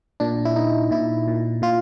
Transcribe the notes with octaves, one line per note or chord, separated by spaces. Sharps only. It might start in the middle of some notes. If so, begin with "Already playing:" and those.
A#2 D4
E4
A#2 D#4
A#2 E4
A#2
A#2 F4